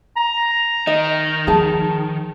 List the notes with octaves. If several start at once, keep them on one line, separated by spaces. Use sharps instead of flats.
A#5
D#3 D#5
F3 G#4 A5